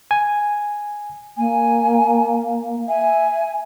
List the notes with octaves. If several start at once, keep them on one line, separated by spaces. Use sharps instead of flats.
G#5
A#3 G#5
E5 G#5